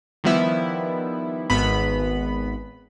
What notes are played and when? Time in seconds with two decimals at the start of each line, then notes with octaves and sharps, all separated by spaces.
0.24 D#3 F3 G3 B3 E4
1.50 G#1 B3 B5